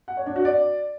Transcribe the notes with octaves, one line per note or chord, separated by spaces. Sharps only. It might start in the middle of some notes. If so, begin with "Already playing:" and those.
F#5
C#5
D4
F#4
D5